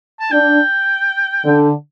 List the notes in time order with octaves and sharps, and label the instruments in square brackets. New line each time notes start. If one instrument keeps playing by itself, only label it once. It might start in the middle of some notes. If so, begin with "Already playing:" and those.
[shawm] A5
[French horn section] D4 [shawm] G5
[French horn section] D3